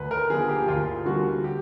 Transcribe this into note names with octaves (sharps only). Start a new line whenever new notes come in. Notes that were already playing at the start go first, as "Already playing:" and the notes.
Already playing: D2 B4
A#4
D3 F3 A#3 G#4
G4
D2 F4
D3 G3 A#3 F#4
G4